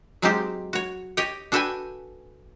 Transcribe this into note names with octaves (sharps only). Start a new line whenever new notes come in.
F#3 G#3 C4 D#4 F4 G4
F#4 C#5
G4 C#5 D#5 G5
D4 F#4 A4 B4 G5 G#5